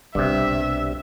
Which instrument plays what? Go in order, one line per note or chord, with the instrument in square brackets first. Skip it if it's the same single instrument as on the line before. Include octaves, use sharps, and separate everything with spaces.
[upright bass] B1 [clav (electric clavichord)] G2 C3 [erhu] E5